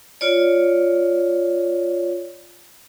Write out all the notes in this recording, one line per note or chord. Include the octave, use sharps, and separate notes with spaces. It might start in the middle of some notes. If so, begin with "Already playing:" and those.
F4 C#5 D5